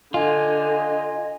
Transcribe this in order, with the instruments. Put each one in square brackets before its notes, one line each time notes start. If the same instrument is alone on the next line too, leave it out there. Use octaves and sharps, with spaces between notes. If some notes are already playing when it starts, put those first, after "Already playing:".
[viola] D3 [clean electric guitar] F4 [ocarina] D#5 [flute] G#5